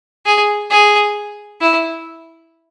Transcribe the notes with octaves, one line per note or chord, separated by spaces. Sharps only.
G#4
G#4
E4